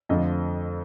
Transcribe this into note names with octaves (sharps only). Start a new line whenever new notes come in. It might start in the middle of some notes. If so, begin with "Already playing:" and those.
F2 D3 F3 A3 D#5